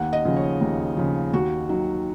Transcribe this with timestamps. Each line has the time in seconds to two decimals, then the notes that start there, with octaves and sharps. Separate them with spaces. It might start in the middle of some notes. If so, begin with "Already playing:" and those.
Already playing: D#2 F#5
0.13 D#5
0.25 C#3 F3
0.36 C#5
0.61 D#2
0.97 C#3 F3
1.33 D#2 F#4
1.69 D#3 F#3